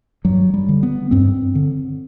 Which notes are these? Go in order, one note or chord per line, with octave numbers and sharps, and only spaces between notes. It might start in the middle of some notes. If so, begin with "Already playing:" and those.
G2 F#3
G3
D3
B3
G2 C4
D3